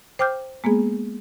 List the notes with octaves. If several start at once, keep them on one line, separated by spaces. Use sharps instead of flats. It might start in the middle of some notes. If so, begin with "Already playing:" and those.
C5 G5 D6 F6 G6
G#3 A#3 B3 G#4